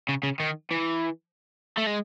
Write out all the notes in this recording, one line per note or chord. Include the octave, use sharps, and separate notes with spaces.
C#3
C#3
D#3
E3
A3
G#3